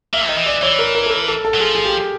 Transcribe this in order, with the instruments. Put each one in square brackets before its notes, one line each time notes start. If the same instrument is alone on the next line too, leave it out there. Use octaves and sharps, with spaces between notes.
[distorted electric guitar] A#3 [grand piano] E5
[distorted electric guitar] D#3 [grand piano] D#5
[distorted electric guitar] E3
[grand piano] D5
[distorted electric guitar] E3 [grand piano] C#5
[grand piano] A#4
A#4
A4
A#4
A4
A4
[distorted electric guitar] F#3
[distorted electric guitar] F3 [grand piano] G#4
[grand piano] G#4
G4